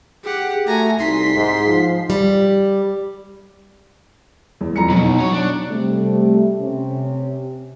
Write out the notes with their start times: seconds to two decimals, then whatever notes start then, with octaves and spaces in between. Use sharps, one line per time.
0.24 G4 G#4 F#5
0.67 A3 F#4 G#5 A#5
0.99 C2 D#4 C6 B6
1.35 G#2
1.67 F3
2.10 G3
4.61 E2
4.76 F2 A#5 C#7
4.90 B2 F#3
5.04 D#4
5.20 F#3 C#5
5.34 D4
5.69 C3 G3 A3
6.60 C3 C4 C#4